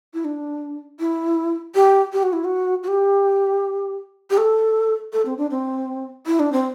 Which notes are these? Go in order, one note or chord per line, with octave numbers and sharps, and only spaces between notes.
E4
D4
E4
G4
G4
F#4
E4
F#4
F#4
G4
G4
A4
A4
C4
D4
C4
E4
D4
C4